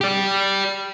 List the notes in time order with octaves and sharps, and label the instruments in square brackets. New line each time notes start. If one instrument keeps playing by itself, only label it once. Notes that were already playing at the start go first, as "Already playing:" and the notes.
[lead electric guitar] G4 D5